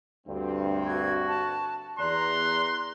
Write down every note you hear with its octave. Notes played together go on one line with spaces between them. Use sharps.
D2 G2 C4
F#4 G#6
A5
E2 D5 A#5 C6 F#6